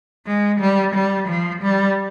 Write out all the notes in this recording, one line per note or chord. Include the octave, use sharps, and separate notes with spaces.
G#3
G3
G3
F3
G3